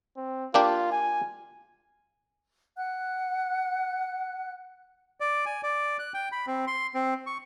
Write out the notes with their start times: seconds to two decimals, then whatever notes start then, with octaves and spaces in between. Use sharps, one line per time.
0.17 C4
0.54 A#3 D4 F4 G4
0.92 G#5
2.77 F#5 F#6
5.20 D5
5.46 G#5
5.63 D5
5.99 F#6
6.14 G5
6.32 B5
6.47 C4
6.67 C6
6.94 C4
7.27 C#6